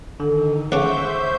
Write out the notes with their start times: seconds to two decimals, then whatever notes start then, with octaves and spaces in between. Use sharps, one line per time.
0.20 D3 D#3 A4
0.72 C#2 C#3 C5 E5 F#5 C#6 D6 G6